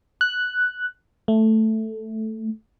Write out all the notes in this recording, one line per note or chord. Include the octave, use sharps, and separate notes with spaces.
F#6
A3